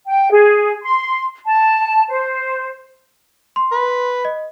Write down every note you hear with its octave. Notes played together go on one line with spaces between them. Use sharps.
G5
G#4
C6
A5
C5
C6
B4
D#5